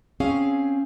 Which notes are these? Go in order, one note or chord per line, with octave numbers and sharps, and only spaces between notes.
C4 C#4 G#4 F5